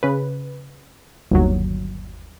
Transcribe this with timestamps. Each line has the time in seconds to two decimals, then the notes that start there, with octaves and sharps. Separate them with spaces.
0.03 C#3 B4
1.31 G1 D#2 F#3